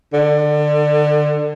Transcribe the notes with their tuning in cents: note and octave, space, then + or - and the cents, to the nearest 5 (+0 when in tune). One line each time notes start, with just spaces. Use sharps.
D3 +25